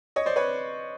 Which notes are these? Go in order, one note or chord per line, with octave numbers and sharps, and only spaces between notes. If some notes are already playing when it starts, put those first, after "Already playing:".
C#5 D#5
C5 D5
B4 C#5